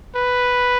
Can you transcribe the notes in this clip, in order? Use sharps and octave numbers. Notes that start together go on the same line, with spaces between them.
B4